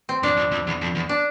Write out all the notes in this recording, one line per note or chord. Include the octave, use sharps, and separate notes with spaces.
C4
F2 D4
F2
F2
E2
F2
E2
D4